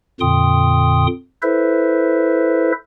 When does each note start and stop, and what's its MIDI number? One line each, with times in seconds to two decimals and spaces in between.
0.21 1.07 41
0.21 1.07 46
0.21 1.07 50
0.21 1.07 79
0.21 1.07 84
0.21 1.07 87
1.42 2.72 64
1.42 2.72 69
1.42 2.72 71
1.42 2.72 72
1.42 2.72 76